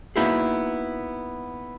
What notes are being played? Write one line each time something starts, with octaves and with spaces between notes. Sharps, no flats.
A#3 B3 D#4 E4 F#4 G#4